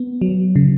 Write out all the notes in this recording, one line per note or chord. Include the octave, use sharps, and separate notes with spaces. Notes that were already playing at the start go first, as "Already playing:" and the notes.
Already playing: B3
F#3
C#3